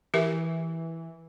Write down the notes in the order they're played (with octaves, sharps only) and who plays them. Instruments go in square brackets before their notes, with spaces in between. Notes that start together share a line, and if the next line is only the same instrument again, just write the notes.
[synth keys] E3 [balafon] G4 A#4 E5